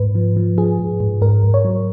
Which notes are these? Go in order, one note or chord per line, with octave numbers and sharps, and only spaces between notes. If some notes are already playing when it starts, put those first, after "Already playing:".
Already playing: G#2 B4
F3
F3
F3 G#4
G#2
G#2
G#2 A#4
G#2
C#5
F#3